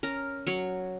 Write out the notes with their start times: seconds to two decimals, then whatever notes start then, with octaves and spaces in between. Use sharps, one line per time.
0.03 C#4 A#4
0.47 F#3 C#5